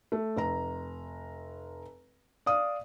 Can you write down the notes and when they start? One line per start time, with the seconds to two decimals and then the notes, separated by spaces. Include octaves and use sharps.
0.12 A3
0.37 F1 A#5
2.46 D5 F5 D#6